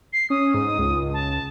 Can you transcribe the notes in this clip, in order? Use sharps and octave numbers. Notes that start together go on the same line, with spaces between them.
C7
C#4 D#6
G#2
C#2
A5